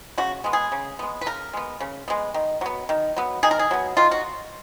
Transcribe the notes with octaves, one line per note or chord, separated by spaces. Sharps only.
C#3 F#4
G#3 B3
G#4
C#3
G#3 B3
B4
C#3 A#4
G#3 B3
C#3
G#3 B3
D#3
F#3 B3
D#3
F#3 B3
D#3 G#4
A#4
G#4
F#3 B3
D#3 F4
F#4